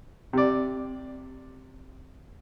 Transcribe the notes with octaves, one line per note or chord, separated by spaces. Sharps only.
C3 D5